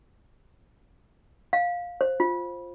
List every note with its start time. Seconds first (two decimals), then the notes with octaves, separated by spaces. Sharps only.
1.53 F5
2.01 C5
2.20 F4